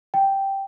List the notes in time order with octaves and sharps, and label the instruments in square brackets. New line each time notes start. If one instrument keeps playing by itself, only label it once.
[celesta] G5